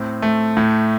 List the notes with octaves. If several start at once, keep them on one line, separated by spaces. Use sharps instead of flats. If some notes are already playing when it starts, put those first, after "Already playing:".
Already playing: A2 C4
A3
A2